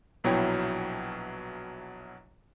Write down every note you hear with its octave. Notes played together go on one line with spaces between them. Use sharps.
A#1 B2 F#3 E4 C#5 G5